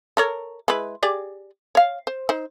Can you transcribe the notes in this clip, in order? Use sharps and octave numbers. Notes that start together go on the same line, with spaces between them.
A4 A#4 C#5
G#3 E4 B4
G4 G#4 D5
C#5 F5
C5
D#4 C5